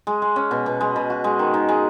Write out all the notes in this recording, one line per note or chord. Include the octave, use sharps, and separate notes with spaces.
G#3
G#3
C#4
B2
B2
G#3
B2
F#4
G#3
D#3
D#3
G#3